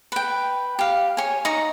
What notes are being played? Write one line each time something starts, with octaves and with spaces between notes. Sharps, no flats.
B4 G5
G4 F5
C#5 G#5
D#4 A#5 C#6